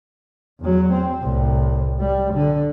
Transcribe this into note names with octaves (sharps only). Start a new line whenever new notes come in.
E2 F#3
C4
C2 A2
G3
D3